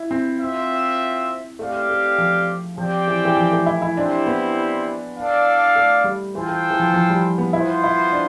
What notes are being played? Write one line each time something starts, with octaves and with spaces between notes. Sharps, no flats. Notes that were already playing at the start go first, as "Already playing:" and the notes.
Already playing: E4
C4
C4 F4 C5 E5
A3 C4 G4 D5 F5
A3
F3
F3 C4 G4 D5 G5
E3
E3
F3
A3
E4
E4
C4 D4 E4 G4 C5
B3
D4 A4 D5 F5
A3
G3
E3 F4 A4 C5 G5
E3
E3
F3
F3
G3
B3
B3 E4 F4 C5
E4
D4